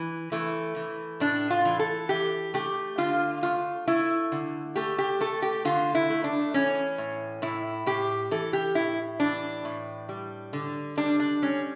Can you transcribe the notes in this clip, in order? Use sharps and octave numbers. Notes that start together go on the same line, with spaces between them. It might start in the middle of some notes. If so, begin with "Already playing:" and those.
Already playing: E3
E3 A3
E3
A2 D4
F4
E3
A4
E3 G4
A3 G4
D3 F4
A3 F4
A3 E4
D3
A3 G4
G4
A3 A4
G4
D3 F4
E4
A3
D4
E3 C#4
A2
A2 E4
A2 G4
E3 A4
G4
A2 E4
E3 D4
A2
G3
D3
G3 D4
D4
G3 C#4